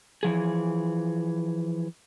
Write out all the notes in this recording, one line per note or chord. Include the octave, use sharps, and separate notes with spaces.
E3 F3 G#4